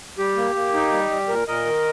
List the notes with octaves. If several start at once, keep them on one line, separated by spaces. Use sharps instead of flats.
G3 G4
A#3
A#3
D#4
G3
G3
A#2 A#4
A#2 A#4 D#5
D#3